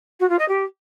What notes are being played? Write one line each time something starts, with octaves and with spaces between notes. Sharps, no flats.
F#4
F4
D#5
G4